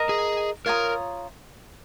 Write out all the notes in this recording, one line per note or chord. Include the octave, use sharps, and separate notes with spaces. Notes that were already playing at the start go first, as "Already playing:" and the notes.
Already playing: A#4 D#5 A#5
G#4
F4 A#4 C#5 A#5 D#6